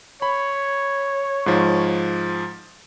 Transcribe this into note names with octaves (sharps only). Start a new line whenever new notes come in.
C#5 B5
G#2 F3